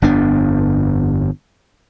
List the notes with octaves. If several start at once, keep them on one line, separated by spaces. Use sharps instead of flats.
G1 F2 B3 D4